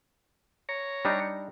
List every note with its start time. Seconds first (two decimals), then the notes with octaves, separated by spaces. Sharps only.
0.69 C#5 A#5
1.05 G3 D4 D#4